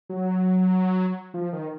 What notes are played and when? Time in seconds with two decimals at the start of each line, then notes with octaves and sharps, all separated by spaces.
0.10 F#3
1.34 F3
1.53 D#3